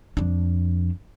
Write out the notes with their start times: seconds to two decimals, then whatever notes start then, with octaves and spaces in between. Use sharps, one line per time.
0.17 F2 D4